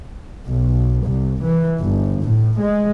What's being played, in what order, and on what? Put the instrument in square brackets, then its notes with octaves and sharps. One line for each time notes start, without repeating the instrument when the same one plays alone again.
[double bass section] B1
C2
E3
G1
A2
G#3